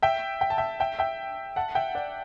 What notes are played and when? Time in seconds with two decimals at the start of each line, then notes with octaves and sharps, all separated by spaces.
0.02 E5 G5
0.41 G5
0.50 A5
0.58 E5 G5
0.80 E5 G5
0.99 E5 G5
1.56 F#5 A5
1.75 E5 G5
1.95 D5 F#5